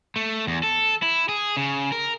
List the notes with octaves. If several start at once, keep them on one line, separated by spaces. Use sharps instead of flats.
A3
E2
A4
E4
G#4
C#3
A#4